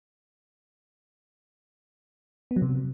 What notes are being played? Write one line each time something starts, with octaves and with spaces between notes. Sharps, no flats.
B3
F#3
C3